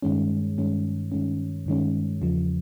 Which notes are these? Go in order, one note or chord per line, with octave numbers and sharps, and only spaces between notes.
G2 D#3 G#3 C#4
G2 D#3 G#3 C#4
G2 D#3 G#3 C#4
G2 D#3 G#3 C#4
E2 C#3 F3